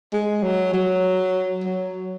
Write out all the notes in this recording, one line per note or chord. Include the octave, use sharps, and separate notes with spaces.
G#3
F#3
F#3
F#3